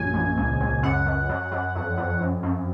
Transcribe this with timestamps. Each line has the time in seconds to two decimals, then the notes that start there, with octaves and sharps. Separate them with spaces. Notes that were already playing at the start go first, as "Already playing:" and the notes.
Already playing: A#1 F#2 G#5
0.14 A#1
0.37 C#2
0.61 C#2
0.83 F#2 F#5
1.06 F#2
1.29 F#2
1.52 F#2
1.75 F2
1.98 F2
2.21 F#2
2.43 F#2